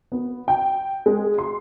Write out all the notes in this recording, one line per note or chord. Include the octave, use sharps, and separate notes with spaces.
B3
G5
G#3
C6